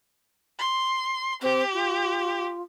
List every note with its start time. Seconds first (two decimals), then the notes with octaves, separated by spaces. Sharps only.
0.59 C6
1.42 C4 G4
1.74 F4